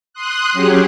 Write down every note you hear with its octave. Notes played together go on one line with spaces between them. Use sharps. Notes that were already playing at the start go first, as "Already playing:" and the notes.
C6 D#6 F#6
F#3 C#4 G4 G#4